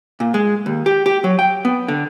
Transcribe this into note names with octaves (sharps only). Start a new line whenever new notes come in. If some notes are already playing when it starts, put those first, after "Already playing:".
A#2
G#3
D#2
G4
G4
F#3
G5
B3
D3